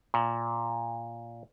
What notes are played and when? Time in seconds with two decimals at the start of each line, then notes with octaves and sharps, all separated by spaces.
0.14 A#2